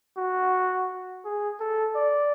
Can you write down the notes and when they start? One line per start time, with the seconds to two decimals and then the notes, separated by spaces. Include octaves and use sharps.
0.17 F#4
1.25 G#4
1.60 A4
1.95 D5